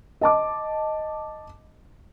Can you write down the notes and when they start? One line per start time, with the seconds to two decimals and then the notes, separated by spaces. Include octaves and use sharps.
0.21 D#5 A5 D6